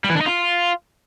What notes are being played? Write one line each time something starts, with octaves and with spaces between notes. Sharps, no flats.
G3
E3
D4
D#4
F4